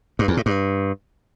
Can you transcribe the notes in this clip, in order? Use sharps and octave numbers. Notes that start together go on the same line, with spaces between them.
G2
E2
A2
G2